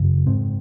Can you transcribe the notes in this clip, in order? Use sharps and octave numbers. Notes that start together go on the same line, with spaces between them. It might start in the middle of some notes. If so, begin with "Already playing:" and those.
Already playing: F#2 C#3
G#2 C4